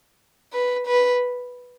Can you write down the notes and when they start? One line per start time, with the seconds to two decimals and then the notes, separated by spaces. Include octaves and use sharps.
0.53 B4
0.87 B4